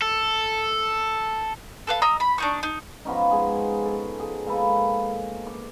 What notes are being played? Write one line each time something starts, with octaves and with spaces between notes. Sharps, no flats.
A4
A4 B4 F5
D#5 A#5 D#6 E6
B5
D4 D#4 C#6
D#4
F3 B3 C#4 D#4
G#3 G#4
A4
G#4
G#3 A#3 A4 B4
D6